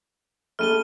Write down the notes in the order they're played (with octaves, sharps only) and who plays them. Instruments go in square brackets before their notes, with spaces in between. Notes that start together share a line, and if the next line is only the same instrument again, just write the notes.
[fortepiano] A#1 A3 [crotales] F6 D#7 G7